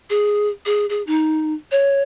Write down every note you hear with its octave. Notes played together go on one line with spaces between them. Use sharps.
G#4
G#4
G#4
D#4
C#5